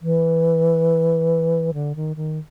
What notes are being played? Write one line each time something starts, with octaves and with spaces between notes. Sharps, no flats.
E3
D3
D#3
D#3